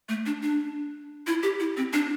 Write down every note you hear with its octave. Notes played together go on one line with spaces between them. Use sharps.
A3
D4
D4
E4
G4
E4
C4
D4